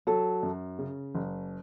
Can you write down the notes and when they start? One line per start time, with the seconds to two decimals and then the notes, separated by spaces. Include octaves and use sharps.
0.07 F#3 A4
0.43 F#2
0.79 C#3
1.15 F#1